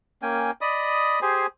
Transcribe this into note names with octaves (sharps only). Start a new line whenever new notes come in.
A#3 C#4 G5 G#5
D5 D#5 B5 D#6
G4 G#4 C5 G#5